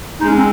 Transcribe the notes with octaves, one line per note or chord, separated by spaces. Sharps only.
G#3 D#4
C#4
C4